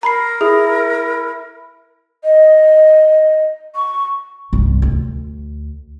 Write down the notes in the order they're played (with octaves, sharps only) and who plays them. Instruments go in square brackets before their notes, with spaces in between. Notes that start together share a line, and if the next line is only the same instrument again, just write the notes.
[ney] A#4 [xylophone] A#5 B5 C7
[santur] E4 [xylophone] G#4
[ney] D#5
C#6
[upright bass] C2 G2
D2